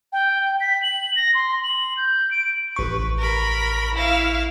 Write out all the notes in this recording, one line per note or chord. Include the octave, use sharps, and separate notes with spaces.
G5
B6
F#7
A#6
C6
F#7
G6
D7
A1 B4 C#6
A#4 B5
E4 F5